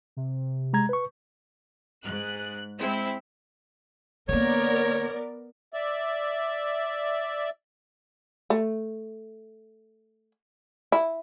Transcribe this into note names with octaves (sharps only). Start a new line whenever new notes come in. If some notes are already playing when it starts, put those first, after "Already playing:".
C3
G#3 A#5 G#6
B4 C#6
G#2 F#6
G#3 C4 E4
D3 A#3 B3 A#4 C#5 D5
D5 E5
A3
E4